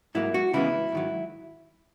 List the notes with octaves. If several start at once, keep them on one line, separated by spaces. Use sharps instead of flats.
G#2 F#3 A#3 E4
F#4
C#3 E3 G#3 B3 E4
G#2 D#3 F#3